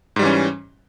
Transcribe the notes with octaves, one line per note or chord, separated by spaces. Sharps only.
G#2 E3 G3 C#4